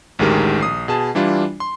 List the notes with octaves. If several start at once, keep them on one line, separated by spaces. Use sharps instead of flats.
A1 D2 D#3 G#3 G4 A#4
A#1 D#6 C7
B2 G#4 A5
E3 G3 D4 E4 F4
C6